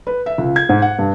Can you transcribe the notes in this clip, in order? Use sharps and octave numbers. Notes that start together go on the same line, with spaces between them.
B4
E5
C#2
G#6
G#2
F#5
G2